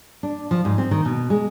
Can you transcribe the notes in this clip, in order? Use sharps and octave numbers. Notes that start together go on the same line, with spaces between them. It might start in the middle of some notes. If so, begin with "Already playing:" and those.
D4
F3
G#2
C4
D#3
B2
G#3